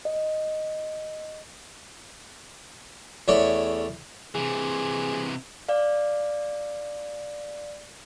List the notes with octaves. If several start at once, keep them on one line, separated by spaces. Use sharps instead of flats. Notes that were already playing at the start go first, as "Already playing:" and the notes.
D#5
E2 A3 C#5 D5
C3 E3 G#4
D5 F5